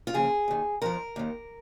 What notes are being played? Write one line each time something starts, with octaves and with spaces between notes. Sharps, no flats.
F4
D#2 C#3 F3 G#4
D#2 D#3
F2 F3 A#4
D#2 D#3